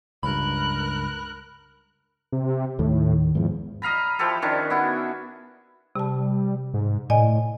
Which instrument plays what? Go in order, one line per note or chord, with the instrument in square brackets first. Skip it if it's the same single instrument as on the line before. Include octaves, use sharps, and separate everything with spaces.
[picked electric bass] C#2 G2 [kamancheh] A#4 F#6 [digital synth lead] B5
[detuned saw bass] C3
[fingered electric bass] D#2 D#3 [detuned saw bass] A2
[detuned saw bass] E2 [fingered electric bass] G#2 F3
[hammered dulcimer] D#5 F5 A#5 B5
F3 E4 G4 A4
D#3 C#4 D4
B3 E4 F#4
[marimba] C3 A5 [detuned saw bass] G3
[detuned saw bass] G#2
[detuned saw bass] A2 [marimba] D5 D#5 G#5